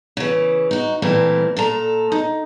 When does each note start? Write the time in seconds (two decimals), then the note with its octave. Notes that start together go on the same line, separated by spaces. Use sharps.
0.17 C#3 E3
0.71 D#4 F#4
1.02 A#2 E3 G3 A3 C4
1.57 A#2 A4 A#5
2.12 D#4